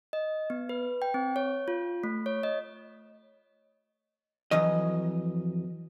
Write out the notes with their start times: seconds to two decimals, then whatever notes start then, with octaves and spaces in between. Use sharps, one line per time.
0.13 D#5
0.50 B3
0.69 B4
1.02 G5
1.14 C4
1.36 C#5
1.68 F4
2.04 A3
2.26 C#5
2.43 D#5
4.51 F2 E3 F#3 D#5